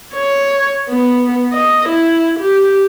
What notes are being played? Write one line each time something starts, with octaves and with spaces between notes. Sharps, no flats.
C#5
B3
D#5
E4
G4